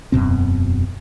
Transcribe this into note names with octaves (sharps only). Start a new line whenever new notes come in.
E1 F#2 B2 C4